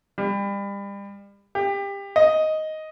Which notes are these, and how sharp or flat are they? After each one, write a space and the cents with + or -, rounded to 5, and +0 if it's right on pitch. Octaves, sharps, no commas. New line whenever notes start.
G3 +35
G4 +25
D#5 +5